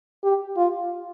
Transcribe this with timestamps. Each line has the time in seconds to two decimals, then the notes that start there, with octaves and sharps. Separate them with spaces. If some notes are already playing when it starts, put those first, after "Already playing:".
0.24 G4
0.57 F4